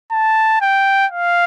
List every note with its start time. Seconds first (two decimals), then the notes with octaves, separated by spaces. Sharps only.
0.12 A5
0.61 G5
1.12 F5